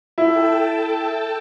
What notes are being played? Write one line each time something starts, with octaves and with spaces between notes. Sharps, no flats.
E4 A4 G5 A5